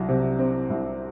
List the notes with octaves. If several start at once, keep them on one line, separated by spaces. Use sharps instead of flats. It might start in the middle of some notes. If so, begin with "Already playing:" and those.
Already playing: C2 F#3
C3
C4
C2